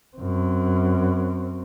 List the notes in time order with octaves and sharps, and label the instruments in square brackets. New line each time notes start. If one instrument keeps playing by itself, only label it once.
[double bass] F#2 C4